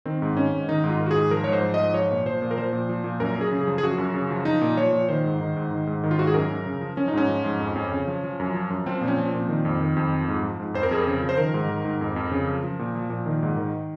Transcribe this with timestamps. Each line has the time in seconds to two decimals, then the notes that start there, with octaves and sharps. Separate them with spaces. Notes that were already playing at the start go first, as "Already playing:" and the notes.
0.05 D#3 C4
0.22 G#2
0.37 D#3 C#4
0.53 G#2
0.69 D#3 D#4
0.84 G#2
0.90 F4
1.00 D#3
1.06 F#4
1.11 G#2 G#4
1.31 F3 A#4
1.44 G#2 C#5
1.53 C5
1.63 F3
1.74 G#2 D#5
1.94 F3 C#5
2.11 A#2
2.26 F3 C5
2.42 A#2
2.51 A#4
2.57 F3 C5
2.73 A#2
2.89 F3
3.04 A#2
3.20 F#2 A#4
3.36 F#2
3.41 G#4
3.52 C#3
3.61 G#4
3.67 F3
3.78 G#4
3.83 F#2 F#4
3.98 F#2
4.14 C#3
4.30 F3
4.45 F3 D#4
4.61 A#2
4.77 F3 C#5
4.93 A#2
5.09 D#3 C5
5.24 G#2
5.41 D#3
5.56 G#2
5.71 D#3
5.87 G#2
6.04 D#3
6.11 F4
6.18 G#2 F#4
6.27 G#4
6.34 F#2 A#4
6.50 F#2
6.66 C#3
6.81 F3
6.97 F3 C#4
7.08 D#4
7.13 G#2 C#4
7.29 F3
7.44 G#2
7.60 F2
7.75 F2
7.92 C#3
8.07 F3
8.24 F3
8.40 F#2
8.54 F3
8.70 F#2
8.86 F3 C4
9.01 A#2
9.08 C#4
9.18 F3
9.28 C4
9.34 A#2
9.49 D#3
9.65 F2
9.81 D#3
9.96 F2
10.13 F3
10.28 G#2
10.43 F3
10.60 G#2
10.74 F2 C5
10.83 A#4
10.91 F2 G#4
11.01 A#4
11.07 C#3
11.23 F3
11.29 C5
11.37 D#3 A#4
11.54 G#2
11.69 D#3
11.85 G#2
12.01 F2
12.16 F2
12.31 C#3
12.48 F3
12.64 F3
12.79 A#2
12.95 F3
13.10 A#2
13.26 D#3
13.43 G#2
13.57 D#3